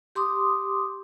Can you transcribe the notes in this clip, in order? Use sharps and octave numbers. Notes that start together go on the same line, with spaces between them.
G4 C6 D6 D#6